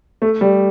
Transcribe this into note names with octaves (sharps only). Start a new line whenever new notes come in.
A3
G3